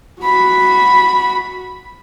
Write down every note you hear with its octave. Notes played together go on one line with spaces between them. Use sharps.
F#4 B5